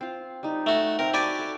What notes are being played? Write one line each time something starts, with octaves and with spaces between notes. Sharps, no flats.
C4 F4
G3 D#4
A3 F#4
C4 A#4
F#4 G4 D5 G#5 A5 B5
A4